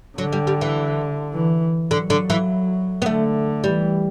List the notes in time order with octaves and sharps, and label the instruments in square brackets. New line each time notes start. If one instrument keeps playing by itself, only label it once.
[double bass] D3 [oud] F#3
[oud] G3
G3
E3
[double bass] E3
[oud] D3 [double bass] F#3
[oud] D3
E3
B3
[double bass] D3 [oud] A3
[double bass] E3 [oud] G3